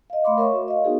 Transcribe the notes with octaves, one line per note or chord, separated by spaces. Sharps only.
D#5 F5
A3 F5 B5 C6 D6
A#4 C#5 E5 C#6
F#4 E5
D#5 F5
B3 D#4 F#4 G#4 A#4